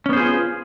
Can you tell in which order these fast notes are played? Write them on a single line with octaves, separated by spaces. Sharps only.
C#4 B3 C5 G#4 F4